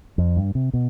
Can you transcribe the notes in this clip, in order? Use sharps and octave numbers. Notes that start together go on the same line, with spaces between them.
F2
G2
C3
B2